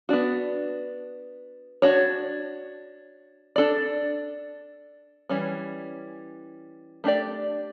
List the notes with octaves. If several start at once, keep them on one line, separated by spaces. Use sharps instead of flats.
B3 D4 F#4
D4 F#4 C#5
D4 A4 D5
E3 G3 C#4
A3 D4 G4 D5